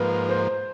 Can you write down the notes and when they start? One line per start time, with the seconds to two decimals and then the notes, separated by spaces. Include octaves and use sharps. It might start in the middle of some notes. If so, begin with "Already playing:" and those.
Already playing: G#2 F3 A#3 B4
0.29 C5